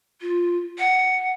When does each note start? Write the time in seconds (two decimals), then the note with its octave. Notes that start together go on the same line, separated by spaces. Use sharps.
0.22 F4
0.79 F#5